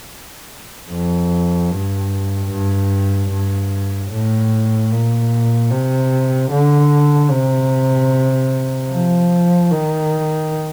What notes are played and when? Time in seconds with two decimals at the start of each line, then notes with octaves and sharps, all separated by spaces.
0.90 F2
1.71 G2
2.51 G2
3.31 G2
4.11 A2
4.91 A#2
5.71 C3
6.51 D3
7.31 C3
8.90 F3
9.71 D#3